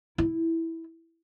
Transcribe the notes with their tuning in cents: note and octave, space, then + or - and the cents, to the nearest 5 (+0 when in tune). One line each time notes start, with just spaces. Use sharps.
E4 -5